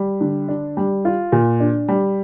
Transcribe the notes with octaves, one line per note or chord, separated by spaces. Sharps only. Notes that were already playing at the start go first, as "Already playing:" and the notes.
Already playing: G3
D3
D4
G3
F4
A#2
D4
G3